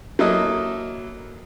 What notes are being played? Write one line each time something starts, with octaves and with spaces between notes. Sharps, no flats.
F#3 A#3 E4 A4 D#5